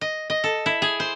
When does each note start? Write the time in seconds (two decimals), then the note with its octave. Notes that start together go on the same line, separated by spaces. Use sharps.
0.01 D#5
0.30 D#5
0.44 A4
0.66 E4
0.82 G#4
1.00 C5